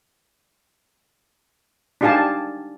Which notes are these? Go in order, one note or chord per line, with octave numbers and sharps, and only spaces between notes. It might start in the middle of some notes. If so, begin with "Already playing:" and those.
D4 D#4 G4 F5 G#5 A5